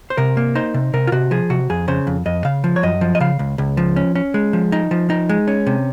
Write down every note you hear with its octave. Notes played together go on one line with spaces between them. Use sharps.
C5
C3 A#4
A#3
D#4 C5
C3
C3 A#4
F4
C3 F#4
F3 G#4
C3 F#4
F2 G#4
C#3 C5
F2
F2 D#5
C#3 F5
F3
C#5
F#2 D#5
F3
D#5
C#3 F5
C#2
C#2
F3
C#4
C#4
G#3
F3
D#4
F3
D#4
G#3
C#4
C3